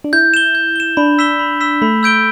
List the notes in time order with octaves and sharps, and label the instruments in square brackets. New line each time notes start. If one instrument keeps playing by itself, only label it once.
[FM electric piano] D4
[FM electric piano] E4 [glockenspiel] G6
[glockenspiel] E7 G7
G6
E7 G7
[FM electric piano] D4 [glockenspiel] B5
[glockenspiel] E6 B6 E7 G7
B5
E6 B6 E7 G7
[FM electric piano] A3 [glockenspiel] B5
[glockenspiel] E6 G6 D7 G7